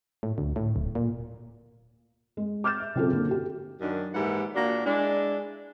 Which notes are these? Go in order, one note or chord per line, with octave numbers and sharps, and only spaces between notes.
A2
D2
A2
D1
A#2
G#3
D6 F6 G6 A6 E7
E5
C#3 F#3 C4 F4 G#4 A4
D3 A#3
F#4 G4
F#2 D#3 D4
D#2 G#2 E3 E4 G4 F#5
A#2 A#3 D4 F#4
G#3 D4 E4